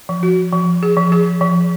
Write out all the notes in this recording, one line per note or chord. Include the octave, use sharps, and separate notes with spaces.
F3
F#4
F3
G#4
F3
G#4
F3